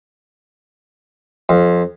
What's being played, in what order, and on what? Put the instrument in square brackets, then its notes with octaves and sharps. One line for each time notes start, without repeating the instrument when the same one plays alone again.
[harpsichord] F2